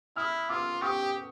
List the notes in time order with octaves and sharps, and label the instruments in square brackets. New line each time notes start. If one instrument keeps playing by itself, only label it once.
[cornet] E4 [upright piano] D#6 F6
[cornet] F4 [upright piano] D6 E6
[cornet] G4 [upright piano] C#6 D#6